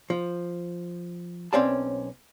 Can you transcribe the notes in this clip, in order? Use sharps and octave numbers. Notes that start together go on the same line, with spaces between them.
F3
B1 C4 C#4 D5 F5 A5